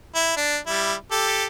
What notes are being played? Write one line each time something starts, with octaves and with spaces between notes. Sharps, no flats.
E4
D4
G3 E4
G4 A4